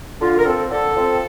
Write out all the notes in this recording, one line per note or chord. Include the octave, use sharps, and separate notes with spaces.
D3 F4
A#4
F3 C4 A4
D3 A4
F3 C4